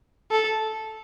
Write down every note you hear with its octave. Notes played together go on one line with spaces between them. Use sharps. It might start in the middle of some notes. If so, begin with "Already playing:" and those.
A4